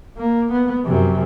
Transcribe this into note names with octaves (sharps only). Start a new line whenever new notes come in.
A#3
B3
F#2 C3